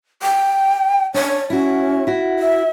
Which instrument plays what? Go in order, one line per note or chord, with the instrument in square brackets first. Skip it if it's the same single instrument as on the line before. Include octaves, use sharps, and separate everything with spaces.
[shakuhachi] G5
[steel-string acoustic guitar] D4 [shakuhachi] C#5
[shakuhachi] C#4 [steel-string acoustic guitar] E4 F#4
[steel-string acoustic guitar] E4 F#4
[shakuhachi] E5